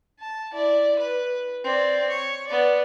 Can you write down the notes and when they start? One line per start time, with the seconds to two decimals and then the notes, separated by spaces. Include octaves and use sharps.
0.19 A5
0.53 E4 D5
0.99 B4
1.64 C4 D5
2.10 C#5
2.47 B3 D5